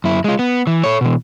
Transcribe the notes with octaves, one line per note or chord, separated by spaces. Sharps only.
F#2 E4
G#3 F4
B3
E3
A4 C#5
B2 E3